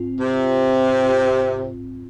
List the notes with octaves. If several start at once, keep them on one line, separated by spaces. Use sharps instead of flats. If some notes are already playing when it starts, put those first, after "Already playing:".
Already playing: G#2 C4 F4
C3